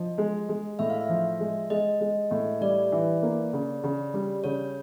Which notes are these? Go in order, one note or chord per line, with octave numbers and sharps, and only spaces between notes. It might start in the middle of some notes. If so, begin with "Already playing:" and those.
Already playing: F3 D#5
G#3
G#3
A2 E5
F5
E5
F3
G#3
G#3 D#5
G#3
A2
G3 D5
E3
A#3
C#3
C#3
G3
C#3 C#5